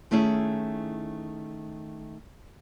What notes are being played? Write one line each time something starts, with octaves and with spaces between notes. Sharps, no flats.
D#3 A3 C#4 E4 G#4